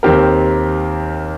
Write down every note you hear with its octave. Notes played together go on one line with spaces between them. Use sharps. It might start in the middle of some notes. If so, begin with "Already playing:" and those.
D#2 D#3 C4 G4 A#4